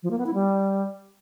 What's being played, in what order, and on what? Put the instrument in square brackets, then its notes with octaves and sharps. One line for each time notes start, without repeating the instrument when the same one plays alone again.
[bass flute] F3
A#3
B3
E4
G3